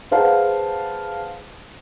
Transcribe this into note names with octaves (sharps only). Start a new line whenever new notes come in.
G#4 B4 C5 F5 F#5 A5